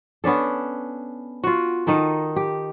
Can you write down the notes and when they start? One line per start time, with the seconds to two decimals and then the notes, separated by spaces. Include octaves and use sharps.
0.24 B3 C#4 D4 A4
1.44 F4 F#4
1.87 D#3 D#4 A4 A#4
2.36 G4